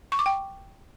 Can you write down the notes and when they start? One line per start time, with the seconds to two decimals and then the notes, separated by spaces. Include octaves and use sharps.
0.12 C#6
0.19 D6
0.26 G5